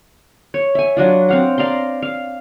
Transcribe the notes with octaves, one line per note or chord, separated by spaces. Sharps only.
C#5
E5 G#5
F#3 D4 F4
C4 F5 F#5
D5 F5 A#5 C6
F5